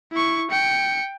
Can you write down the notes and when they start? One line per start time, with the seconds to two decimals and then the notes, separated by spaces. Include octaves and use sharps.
0.12 E4 C#6
0.50 G5 C#7